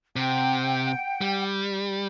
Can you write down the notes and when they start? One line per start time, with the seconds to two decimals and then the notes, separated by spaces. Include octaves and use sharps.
0.16 C3 F#5 G5
1.21 G3